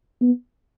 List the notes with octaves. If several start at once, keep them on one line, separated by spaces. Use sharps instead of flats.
B3